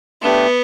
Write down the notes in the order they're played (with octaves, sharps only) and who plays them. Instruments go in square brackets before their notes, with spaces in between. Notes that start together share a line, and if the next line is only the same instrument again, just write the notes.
[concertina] A3 D4 G4 [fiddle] B3